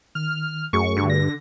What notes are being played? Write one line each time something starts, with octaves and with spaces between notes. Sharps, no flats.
D#3 F6
F#2 A3 F#4 G#4 C#6
G2 D3
A#6